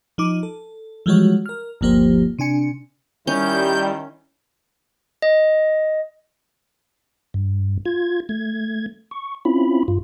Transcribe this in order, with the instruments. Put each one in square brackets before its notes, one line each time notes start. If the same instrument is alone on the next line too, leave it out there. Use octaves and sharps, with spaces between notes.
[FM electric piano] F3 D#4 D6
A4
E3 F3 G3 G#3 F#4 C#5
A#4 F6
G1 D2 F3 A#3 G4 C5
C3 D4 G#5 C#7
[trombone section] D#3 E4 [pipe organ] G3 [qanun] C#4 [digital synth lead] G6
[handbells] D#5
[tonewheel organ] G2
F4 G#6
A3 G#6
C#6
C4 C#4 E4 F4 B5
G2 F4